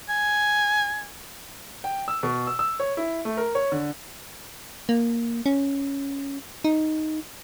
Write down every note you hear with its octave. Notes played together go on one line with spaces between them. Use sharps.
G#5
G5
E6
B2
E6
E6
C#5
E4
A3
A#4
C#5
D3
A#3
C#4
D#4